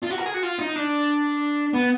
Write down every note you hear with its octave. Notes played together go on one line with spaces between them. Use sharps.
F4
F#4
A#4
G#4
F#4
F4
D#4
D4
B3